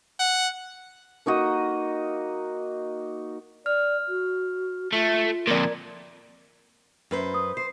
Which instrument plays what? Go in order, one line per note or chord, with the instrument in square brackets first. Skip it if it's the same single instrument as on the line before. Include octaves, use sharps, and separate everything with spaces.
[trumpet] F#5
[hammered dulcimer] A#3 D#4 F#4 D#5
[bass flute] D5 [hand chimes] F6
[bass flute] F#4
[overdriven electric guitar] A3 [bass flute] F4
[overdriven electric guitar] F2 A#2 [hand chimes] A#4 D5
[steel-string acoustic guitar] F#2 B4 C5
[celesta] D#6
[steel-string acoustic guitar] C5 [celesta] C7